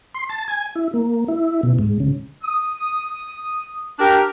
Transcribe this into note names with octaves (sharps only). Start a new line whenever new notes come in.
C6
A5
G#5
E4
A#3
E4
B2
G#2
C#3
D#6
D4 G4 A#4